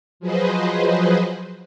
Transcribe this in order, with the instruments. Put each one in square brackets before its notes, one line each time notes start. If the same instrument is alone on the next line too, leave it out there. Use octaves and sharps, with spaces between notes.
[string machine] F3 F#3 G#4 B4 C5 D#5